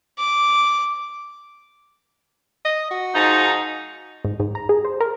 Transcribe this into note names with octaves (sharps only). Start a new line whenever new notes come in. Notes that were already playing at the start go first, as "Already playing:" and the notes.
D6
D#5
F#4
G#2 F3 D#4
G#2
G#2
A#5
G#4
C5
A#4